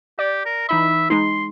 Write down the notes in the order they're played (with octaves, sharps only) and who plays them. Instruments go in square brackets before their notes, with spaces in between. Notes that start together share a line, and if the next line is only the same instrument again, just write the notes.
[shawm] G4 [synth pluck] D5
[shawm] A#4
[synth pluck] E3 D#4 B5 [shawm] E5
[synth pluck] G#3 D#4 [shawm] C6